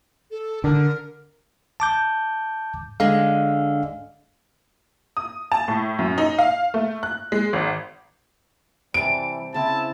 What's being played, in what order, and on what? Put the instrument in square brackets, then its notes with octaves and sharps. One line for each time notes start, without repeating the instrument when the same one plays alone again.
[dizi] A4
[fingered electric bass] D3 [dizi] A#4
[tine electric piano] A5 D6 G6
[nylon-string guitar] D3 G#3 [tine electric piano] F5
[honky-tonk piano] D#6
A5
A2
F#2
D#4
F5
A3
F#6
G#3
G#1
[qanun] C3 A5 [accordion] E3 G3 [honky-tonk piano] D7
[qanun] C#3 C4 [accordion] E4 [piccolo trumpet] A5